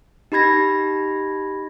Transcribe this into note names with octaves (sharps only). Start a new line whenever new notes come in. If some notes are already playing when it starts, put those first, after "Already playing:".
D#4 G4 B5 G#6 A#6